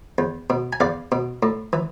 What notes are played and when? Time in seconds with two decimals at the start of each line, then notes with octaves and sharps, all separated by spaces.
0.18 E2
0.50 B2
0.73 G#5
0.80 E2 D5 F5
1.12 B2
1.43 A2
1.73 E3